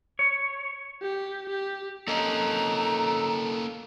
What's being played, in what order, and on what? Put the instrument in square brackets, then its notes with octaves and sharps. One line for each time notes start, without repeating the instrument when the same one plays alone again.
[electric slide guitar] C#5
[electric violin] G4
G4
[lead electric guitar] A#3 C#4 [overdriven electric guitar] A4 D#5 [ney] A#5